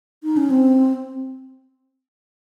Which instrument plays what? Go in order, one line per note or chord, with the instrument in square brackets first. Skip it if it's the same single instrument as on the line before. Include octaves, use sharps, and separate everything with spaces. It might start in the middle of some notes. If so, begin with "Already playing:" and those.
[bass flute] D#4
C#4
C4